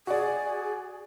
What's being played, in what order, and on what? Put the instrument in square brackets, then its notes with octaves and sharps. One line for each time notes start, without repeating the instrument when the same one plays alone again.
[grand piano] F#4 D5 [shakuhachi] G#4